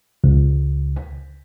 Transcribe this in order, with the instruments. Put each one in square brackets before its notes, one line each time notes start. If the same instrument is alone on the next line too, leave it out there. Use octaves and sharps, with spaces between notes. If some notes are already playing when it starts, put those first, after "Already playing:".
[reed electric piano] C#2